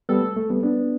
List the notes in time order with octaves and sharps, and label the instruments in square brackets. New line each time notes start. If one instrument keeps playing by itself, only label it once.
[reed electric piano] G3 B3 [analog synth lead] A4
[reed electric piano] A3
A3
G3 B3
B3 D4